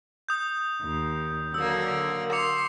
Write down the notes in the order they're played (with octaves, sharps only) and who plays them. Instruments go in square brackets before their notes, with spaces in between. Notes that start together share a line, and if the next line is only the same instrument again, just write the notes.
[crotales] D#6 G6
[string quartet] D#2
[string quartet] D3 F#3 A#3 [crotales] E6
[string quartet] C6 [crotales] D6 C#7 F7